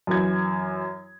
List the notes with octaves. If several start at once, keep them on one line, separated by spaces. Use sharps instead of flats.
F#2 E3 G#6